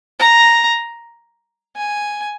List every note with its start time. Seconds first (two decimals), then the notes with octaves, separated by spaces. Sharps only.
0.20 A#5
1.76 G#5